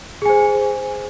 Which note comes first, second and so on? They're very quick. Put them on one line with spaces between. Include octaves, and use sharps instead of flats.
G#4 G#5 C5